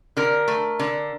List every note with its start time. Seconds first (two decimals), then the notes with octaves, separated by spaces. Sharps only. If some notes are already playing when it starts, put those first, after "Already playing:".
0.17 D3 A#4
0.48 A3
0.79 D3